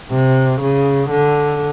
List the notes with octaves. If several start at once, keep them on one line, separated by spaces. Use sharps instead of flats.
C3
C#3
D3